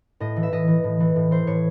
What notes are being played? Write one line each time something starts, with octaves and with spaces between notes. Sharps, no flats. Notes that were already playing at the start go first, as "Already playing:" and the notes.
A2 D#5
E3
E5
A2 D#5
E3
A2
E3
A2
E3 C5
A2 C#5